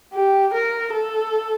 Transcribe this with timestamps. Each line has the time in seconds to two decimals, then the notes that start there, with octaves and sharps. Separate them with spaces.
0.13 G4
0.54 A#4
0.93 A4